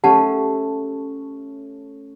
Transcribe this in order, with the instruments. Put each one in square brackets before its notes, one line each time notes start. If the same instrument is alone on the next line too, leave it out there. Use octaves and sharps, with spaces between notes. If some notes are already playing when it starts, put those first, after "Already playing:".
[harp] A3 C#4 [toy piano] G4 F#5 A5